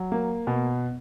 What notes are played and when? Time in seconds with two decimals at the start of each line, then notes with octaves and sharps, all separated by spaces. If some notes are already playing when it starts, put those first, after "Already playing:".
Already playing: F#3
0.12 A#3
0.47 B2